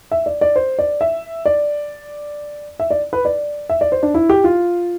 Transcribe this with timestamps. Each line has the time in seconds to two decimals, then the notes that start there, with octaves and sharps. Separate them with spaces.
0.11 E5
0.26 D5
0.41 D5
0.56 C5
0.79 D5
1.01 E5
1.46 D5
2.80 E5
2.90 D5
3.13 B4
3.25 D5
3.70 E5
3.81 D5
3.92 C5
4.03 D4
4.14 E4
4.29 G4
4.44 F4